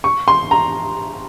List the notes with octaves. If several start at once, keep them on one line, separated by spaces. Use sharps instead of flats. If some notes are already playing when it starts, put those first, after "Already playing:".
C#6
C6
A#5